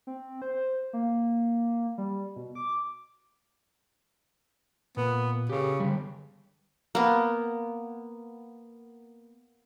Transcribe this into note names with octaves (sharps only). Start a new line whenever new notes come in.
C4
C5
A#3
G3
B2
D6
A#2 B3
C#3 G4 A4
D3 G3
A#3 B3